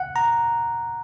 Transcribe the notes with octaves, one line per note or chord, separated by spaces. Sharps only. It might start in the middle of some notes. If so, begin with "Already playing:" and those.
Already playing: F#5
A#5